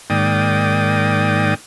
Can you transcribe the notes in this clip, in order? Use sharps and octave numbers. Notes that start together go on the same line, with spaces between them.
G#2 D#3 A#3 D5 G5 D#6